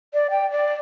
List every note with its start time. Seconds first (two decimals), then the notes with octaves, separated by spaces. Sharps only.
0.14 D5
0.31 G5
0.51 D5